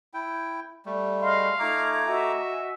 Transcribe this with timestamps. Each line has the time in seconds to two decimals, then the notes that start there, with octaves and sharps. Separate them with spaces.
0.14 E4 G5
0.86 G3 A3
1.21 G#4 D#5 F5 C6
1.59 A3 D#4 F4 A#5 D6 G#6
2.07 F#4 D#5 E5 G#5